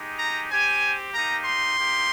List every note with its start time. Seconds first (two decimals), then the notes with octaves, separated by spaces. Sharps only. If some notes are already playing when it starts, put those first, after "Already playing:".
Already playing: G#3 D#4 G4
0.19 A#5
0.50 C4 G4 G#5
1.14 A#3 D#4 G4 A#5
1.45 C6
1.77 A#3 D#4 G4